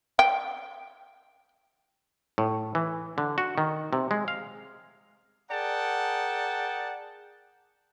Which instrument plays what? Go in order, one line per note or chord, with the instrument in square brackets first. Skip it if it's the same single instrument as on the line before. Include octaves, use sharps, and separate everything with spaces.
[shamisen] G5
[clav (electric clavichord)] A2
E3
D3
F#4
D#3
C3
G#3
F5
[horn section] G#4 A#4 D5 F#5 G5 A5